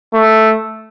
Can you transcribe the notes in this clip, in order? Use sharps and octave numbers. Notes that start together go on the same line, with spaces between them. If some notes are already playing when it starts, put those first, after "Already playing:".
A3